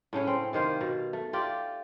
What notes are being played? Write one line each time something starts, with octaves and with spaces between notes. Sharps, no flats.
A2 C#3 C#4 C#5
C4
C3 D#3 C5 F5
B2
A3
F4 G4 D5